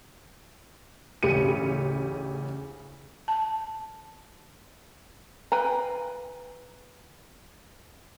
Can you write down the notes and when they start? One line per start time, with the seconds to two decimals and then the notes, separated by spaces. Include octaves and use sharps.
1.23 A1 D2 C#3 G4 C#7 D#7
3.28 A5
5.52 B4 F5 G5 G#5 A#5